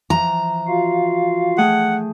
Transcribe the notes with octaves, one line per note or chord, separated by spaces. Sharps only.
E3 F3 A#5
F4 F#4 F5
A3 G#4 F#5 G5